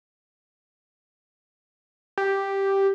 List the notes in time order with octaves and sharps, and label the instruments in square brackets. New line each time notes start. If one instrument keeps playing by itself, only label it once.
[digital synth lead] G4